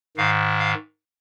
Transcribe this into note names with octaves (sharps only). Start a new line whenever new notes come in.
G#2 D#3 F5
F5